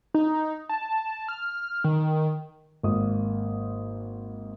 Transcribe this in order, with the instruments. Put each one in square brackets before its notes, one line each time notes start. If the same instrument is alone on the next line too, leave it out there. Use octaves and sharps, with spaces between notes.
[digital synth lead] D#4
A5
F6
D#3
[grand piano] G#1 A#3 D#6